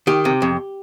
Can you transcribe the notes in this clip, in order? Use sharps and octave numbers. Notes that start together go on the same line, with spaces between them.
D#3 G4
C3
F2